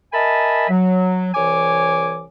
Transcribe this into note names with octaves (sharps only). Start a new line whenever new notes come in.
A#4 D#5 E5 G#5 A5 B5
F#3
C2 E3 C#5 G#5 D6